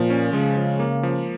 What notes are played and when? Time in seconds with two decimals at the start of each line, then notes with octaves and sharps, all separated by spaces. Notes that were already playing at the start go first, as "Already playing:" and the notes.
Already playing: A#2 F3
0.10 C#4
0.33 C#3 G#3
0.57 F3
0.79 A#3
1.03 F3